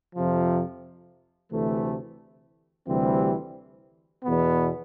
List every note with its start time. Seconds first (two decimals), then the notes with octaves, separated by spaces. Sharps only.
0.15 F2 C3 F3
1.51 D2 C3 E3 A3
2.87 D2 C3 E3 G3 C4
4.24 E2 B2 B3